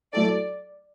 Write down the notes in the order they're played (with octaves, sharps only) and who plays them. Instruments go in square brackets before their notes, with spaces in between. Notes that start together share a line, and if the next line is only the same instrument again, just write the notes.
[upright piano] F#3 A3 E4 A4 [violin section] D5